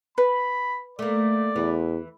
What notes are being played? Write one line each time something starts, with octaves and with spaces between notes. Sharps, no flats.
B4 B5
A3 A#3 D5
E2 E3